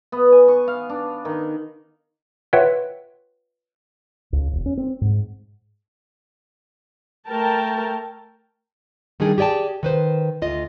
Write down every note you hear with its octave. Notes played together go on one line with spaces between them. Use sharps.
B3
G#5
C#6
F5
D4
D#3
F4 B4 C#5 E5 F#5 G5
C#2
E1
C#4
C4
G#2
A3 A#4 G5 A5
D#3 G3 D4 D#4 G#4
G4 G#4 D5 G5 A5
D#3 B4 C5
D2 F4 D#5